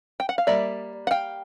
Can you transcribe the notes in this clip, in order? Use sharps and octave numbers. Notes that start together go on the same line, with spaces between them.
G5
F#5
F5
G3 A#3 D5 E5
F#5
F5 G5